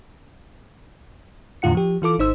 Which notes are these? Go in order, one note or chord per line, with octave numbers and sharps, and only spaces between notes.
E2 A2 D3 F4 F#5 C#7
F3 G4
E3 F4 A4 D6
G#1 D#4 C5 E6